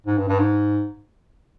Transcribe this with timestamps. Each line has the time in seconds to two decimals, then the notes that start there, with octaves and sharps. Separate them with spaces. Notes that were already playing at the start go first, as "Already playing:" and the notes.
0.07 G#2
0.18 G2
0.29 G2
0.39 G#2